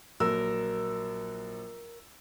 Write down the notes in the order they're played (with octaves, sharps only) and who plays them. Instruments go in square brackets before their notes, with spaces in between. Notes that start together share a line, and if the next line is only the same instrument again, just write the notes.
[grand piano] A#1 F#3 E6 [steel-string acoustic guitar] A#4